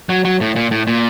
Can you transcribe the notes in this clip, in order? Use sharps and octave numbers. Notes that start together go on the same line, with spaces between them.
F#3
F#3
A2
A#2
A2
A#2